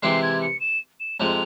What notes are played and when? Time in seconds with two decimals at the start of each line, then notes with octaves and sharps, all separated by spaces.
0.03 C3 E3 G#3 E4 G4 C7
0.23 G#6
0.42 C#7
0.61 E7
1.00 E7
1.20 F2 C3 F3 G#3 F7